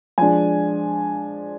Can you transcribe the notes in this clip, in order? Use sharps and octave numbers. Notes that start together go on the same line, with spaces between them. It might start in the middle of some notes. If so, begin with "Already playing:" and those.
F3 G#3 D4 G#5